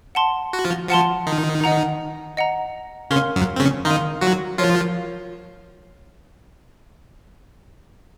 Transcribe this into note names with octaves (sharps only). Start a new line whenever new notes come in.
F#5 A5 C6
F#4
F3 F4
F3 F4 F#5 A5 C6
D#3 D#4
D#5 F#5 A#5
D#5 F#5 A#5
C#3 C#4 A#4 F5 C6 F6
F#2 F#3
C4
C#3 C#4
D#3 D#4 A#4 F5 C6 F6
F#3 F#4
F3 F4 A#4 C#5 F5